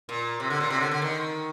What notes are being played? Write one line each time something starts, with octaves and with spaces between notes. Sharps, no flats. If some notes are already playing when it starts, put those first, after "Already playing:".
A#2
C3
D3
A#2
C3
D3
D3
D#3